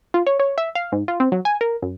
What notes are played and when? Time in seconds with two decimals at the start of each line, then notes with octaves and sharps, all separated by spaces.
0.14 F4
0.27 C#5
0.40 C#5
0.58 E5
0.75 F5
0.92 G#2
1.08 F4
1.20 C4
1.32 F#3
1.45 G#5
1.61 A#4
1.82 F#2